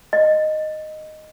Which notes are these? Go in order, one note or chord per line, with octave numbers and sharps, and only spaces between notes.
D#5